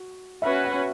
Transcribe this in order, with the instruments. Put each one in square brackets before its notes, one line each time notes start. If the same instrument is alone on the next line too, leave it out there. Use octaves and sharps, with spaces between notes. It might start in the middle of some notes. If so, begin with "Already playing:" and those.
Already playing: [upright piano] F#4
[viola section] C#4 F#4 B4 [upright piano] E5
[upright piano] F#5